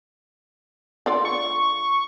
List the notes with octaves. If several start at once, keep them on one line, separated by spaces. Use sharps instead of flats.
D3 F4 D5
C#6